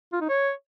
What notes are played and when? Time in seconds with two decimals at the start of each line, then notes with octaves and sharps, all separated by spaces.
0.13 F4
0.21 D#4
0.29 C#5